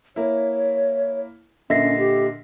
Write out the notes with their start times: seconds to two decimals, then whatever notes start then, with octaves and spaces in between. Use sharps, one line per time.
0.16 A#3 E4 C#5
1.70 A#2 D3 C#4 D#5 E5 A#6 C7
1.98 G4